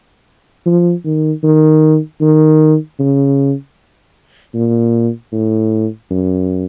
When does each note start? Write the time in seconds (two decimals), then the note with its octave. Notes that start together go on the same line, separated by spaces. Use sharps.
0.66 F3
1.05 D#3
1.43 D#3
2.21 D#3
2.99 C#3
4.55 A#2
5.32 A2
6.11 F#2